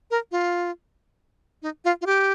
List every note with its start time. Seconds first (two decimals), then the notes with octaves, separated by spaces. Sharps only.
0.11 A#4
0.32 F4
1.63 D#4
1.85 F4
2.01 F4
2.06 G4